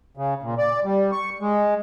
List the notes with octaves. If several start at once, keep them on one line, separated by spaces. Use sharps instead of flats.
C#3
A#2
D5
G3
C#6
G#3